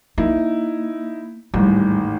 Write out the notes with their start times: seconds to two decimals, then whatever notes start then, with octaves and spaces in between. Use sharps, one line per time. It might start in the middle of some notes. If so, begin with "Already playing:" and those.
0.18 A#3 D#4 E4
1.54 A1 D#2 G#2 G3